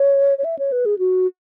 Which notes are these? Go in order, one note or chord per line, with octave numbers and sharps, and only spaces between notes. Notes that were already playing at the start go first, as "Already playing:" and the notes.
Already playing: C#5
C#5
E5
C#5
B4
G#4
F#4